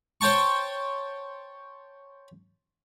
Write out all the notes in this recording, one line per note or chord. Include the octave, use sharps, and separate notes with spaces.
C5 C#5 G5 A5 C#6